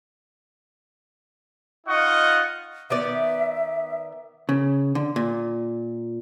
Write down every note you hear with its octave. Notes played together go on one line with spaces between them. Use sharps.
D#4 F4 D#5 F#5 C#6
D#3 B3 D5 E5
C#3
D3
A#2